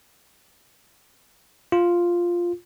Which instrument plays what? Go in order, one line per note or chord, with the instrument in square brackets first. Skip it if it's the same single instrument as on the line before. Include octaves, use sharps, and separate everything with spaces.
[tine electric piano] F4